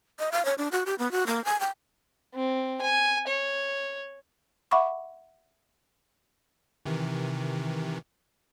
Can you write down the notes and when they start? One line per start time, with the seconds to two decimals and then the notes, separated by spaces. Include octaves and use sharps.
0.19 D#5
0.32 F5
0.45 C#5
0.58 D4
0.72 F#4
0.86 G4
0.99 B3
1.12 F#4
1.27 A#3
1.45 G#5
1.60 G5
2.34 C4
2.81 G#5
3.27 C#5
4.71 E5 F#5 B5 C#6 D6
6.85 C3 D#3 E3